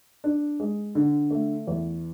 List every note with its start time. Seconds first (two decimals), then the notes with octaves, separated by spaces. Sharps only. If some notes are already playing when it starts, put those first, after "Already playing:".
0.24 D4
0.60 G#3
0.95 D3
1.31 A3
1.67 E2